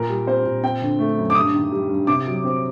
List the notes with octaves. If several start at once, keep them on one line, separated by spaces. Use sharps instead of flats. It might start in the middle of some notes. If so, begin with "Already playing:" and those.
Already playing: A#2 A#4
G3
C4 C5
A#2
C4 G5
D3
A3
F#2
D6
G2 D#6
D#3
G3
G2
C3 D6
F#3
C4